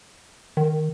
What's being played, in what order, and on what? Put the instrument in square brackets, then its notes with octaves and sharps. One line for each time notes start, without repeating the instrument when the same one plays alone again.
[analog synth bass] D#3